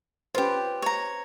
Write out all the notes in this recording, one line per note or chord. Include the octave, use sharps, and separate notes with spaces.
C#4 F4 G4 B4 C5
C#5 A#5